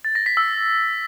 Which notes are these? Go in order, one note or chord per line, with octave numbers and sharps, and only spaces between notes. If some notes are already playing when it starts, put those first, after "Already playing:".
A6
A#6
B6
E6